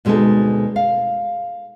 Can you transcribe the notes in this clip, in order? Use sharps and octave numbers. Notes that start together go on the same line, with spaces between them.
D2 B2 G#3 C4 D#4 A4
F5